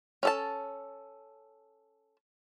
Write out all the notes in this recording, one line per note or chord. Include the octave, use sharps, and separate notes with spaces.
C#4 A4 A5